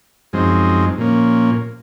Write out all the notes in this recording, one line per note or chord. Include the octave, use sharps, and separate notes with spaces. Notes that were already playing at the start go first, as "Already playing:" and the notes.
F#2 F3 G#3 C4 D#4
A#2 F3 A#3 C#4